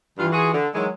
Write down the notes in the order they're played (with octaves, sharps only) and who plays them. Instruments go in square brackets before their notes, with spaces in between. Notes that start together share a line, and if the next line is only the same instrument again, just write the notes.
[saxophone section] G2 F4 [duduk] E3
[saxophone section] F4 F#4 G#4
D3
[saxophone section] D#3 E3 G#3 [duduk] F#3